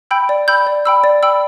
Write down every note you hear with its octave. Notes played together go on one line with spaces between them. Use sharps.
G5 B5 E6 G6
D5
G5 B5 E6 G6
D5
G5 B5 E6
D5
G5 B5 E6